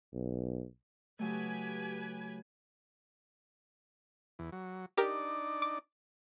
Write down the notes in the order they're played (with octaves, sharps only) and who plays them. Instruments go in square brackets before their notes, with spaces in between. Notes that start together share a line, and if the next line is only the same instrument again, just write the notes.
[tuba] B1
[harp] C#3 F#3 A3 [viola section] G4 B4 G#5
[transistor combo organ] E2
F#3
[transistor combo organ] D4 D#4 D5 [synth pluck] G4 A#4
[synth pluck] D6